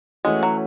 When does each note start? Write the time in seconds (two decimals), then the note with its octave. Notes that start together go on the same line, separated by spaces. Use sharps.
0.25 E3 G#3 A3 C#4 F#4
0.43 F#3